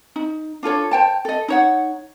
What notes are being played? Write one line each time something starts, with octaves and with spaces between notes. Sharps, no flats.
D#4
D4 F4 A4 C#5
C5 G5 A5
A4 D#5
D#4 C#5 F#5